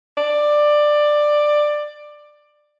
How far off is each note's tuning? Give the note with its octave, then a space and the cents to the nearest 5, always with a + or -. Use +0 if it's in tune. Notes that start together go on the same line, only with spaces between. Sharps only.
D5 +15